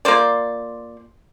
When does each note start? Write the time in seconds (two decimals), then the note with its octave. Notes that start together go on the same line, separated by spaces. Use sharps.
0.05 A#3 F4 C5 D5